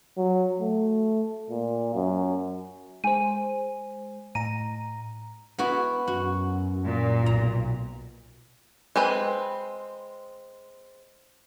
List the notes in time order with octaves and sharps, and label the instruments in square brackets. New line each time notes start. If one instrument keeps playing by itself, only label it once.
[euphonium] F#3
A3
A#2
F#2
[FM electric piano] G#3 C5 [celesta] G#5 D#7
[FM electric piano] A2 A#5 [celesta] D#7
[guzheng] B3 E4 F#4
[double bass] F#2 [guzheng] F#4
[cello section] A#2
[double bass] B1 [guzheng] A#5
[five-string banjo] G#3 C4 B4 B5